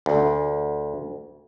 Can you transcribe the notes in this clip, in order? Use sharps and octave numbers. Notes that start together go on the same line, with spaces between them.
D2